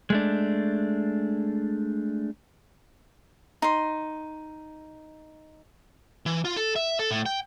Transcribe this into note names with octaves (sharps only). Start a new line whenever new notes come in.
G#3 A3 D4
D#4 C6
E3
F4
A4
E5
A4
A2
G5